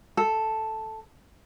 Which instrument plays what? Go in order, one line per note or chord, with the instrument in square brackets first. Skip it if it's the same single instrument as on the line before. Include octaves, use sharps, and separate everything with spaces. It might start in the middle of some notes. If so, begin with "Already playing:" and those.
[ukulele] A4